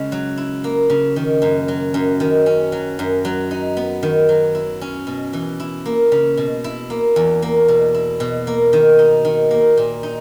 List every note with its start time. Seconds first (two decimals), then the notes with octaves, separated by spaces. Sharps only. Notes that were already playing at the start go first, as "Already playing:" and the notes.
Already playing: C#3 G#3
0.12 F#3
0.38 E4
0.64 A#3
0.90 C#3
1.16 D#3
1.42 F#2
1.68 F#3
1.94 F#2
2.20 D#3
2.46 C#4
2.72 F#3
2.99 F#2
3.25 F#3
3.51 D#4
3.77 B3
4.03 D#3
4.29 F#3
4.55 E4
4.81 C#4
5.07 B2
5.33 E3
5.60 E4
5.86 A#3
6.12 C#3
6.37 B2
6.64 E4
6.90 A#3
7.16 E2
7.42 A#3
7.68 B2
7.94 E4
8.20 B2
8.47 A#3
8.73 D#3
8.99 D#4
9.25 D#3
9.51 A#3
9.77 A#2
10.03 D#4